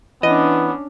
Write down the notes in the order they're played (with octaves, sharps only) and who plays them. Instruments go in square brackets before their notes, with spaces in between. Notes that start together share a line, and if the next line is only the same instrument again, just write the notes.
[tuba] E3 [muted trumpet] B3 [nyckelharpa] C#4 D4 [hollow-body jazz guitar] D#5